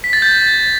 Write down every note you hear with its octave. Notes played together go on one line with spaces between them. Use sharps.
B6
A6
G6